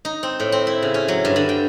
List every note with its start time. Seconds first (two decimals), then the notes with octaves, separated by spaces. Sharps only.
0.05 D#4
0.23 C4
0.40 A2
0.52 C4
0.67 E4
0.82 C#3
0.94 C#4
1.08 F#3
1.25 G2
1.36 D3
1.49 G5